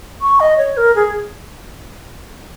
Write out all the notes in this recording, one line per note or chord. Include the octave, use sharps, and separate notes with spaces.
C#6
D#5
C#5
A#4
G#4